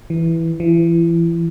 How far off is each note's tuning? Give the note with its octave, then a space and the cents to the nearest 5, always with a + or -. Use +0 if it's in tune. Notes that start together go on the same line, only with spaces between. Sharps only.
E3 +0
E3 +30